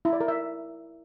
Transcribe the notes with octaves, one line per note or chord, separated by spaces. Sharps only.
E4
D5
A#4
E5